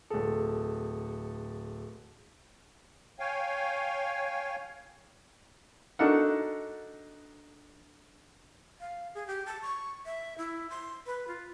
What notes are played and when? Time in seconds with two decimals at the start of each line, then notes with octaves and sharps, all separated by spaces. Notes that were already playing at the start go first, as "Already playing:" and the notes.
0.10 D1 G#4 A4
3.19 C#5 F5 G5 G#5
5.99 D4 D#4 F#4 A4 A#4 F#5
8.80 F5
9.15 G#4
9.27 G4
9.46 A5
9.62 C#6
10.05 E5
10.38 E4
10.70 C6
11.06 B4
11.28 F4